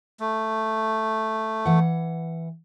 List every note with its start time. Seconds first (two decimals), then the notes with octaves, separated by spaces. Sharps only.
0.20 A3
1.65 E3 F#5